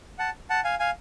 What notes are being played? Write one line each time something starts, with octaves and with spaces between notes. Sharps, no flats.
F#5 A5
F#5 A5
F5 G#5
F5 G#5